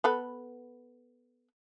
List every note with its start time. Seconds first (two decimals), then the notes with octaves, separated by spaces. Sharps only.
0.04 B3 A4 B4